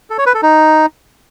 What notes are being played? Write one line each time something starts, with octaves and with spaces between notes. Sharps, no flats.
A4
C#5
B4
A4
D#4